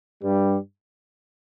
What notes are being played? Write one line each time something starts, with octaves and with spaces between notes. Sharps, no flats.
G2 G3